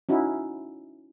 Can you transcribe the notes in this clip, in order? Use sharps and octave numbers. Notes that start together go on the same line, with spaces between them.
C#4 D#4 E4 F#4